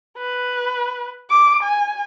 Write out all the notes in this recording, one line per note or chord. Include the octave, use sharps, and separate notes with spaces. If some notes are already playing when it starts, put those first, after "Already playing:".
B4
D6
G#5